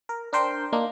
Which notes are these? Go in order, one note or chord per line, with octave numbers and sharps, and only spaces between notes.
A#4
D4 A#4 C5 G5 C6
A#3 D4 D#4